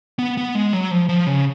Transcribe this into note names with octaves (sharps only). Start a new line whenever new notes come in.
B3
B3
G#3
F#3
F3
F3
C#3